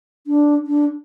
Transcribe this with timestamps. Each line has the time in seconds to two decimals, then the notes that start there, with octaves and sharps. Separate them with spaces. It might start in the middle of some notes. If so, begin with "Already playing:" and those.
0.27 D4
0.67 D4